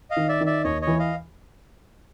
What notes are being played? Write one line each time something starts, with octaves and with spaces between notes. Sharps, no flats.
D#5 F5
D#3
D5 E5
D#3
D5 E5
D#2 C#5 D#5
C#5 D#5
E3
D#5 F5